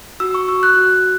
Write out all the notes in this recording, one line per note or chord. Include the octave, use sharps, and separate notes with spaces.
F#4 E6
C#6
F#4 E6
F#6
F#4